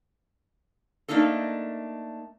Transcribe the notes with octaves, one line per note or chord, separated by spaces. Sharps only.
A3 A#3 D4 D#4 A4